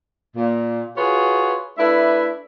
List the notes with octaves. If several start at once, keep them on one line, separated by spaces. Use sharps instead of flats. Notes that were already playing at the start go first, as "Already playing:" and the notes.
A#2
F4 F#4 G#4 B4 C#5
A3 D4 E4 B4 D5 E5